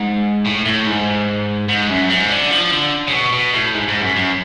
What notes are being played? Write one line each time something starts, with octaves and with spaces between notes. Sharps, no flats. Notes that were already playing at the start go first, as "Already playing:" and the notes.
Already playing: G#2
A2
A2
G#2
G#2
F#2
G#2
D3
F3
D3
C#3
B2
B2
A2
G#2
G#2
F#2
F#2